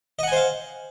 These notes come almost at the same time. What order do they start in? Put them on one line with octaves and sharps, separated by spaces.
D#5 F#5 G#5 C5 F5